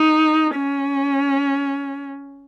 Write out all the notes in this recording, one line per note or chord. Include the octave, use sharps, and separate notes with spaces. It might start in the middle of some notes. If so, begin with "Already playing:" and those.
Already playing: D#4
C#4